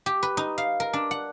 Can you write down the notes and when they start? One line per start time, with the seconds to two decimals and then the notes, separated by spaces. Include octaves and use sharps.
0.06 G4
0.23 B4
0.37 D#4
0.58 F5
0.80 A#4
0.93 D4
1.11 F#5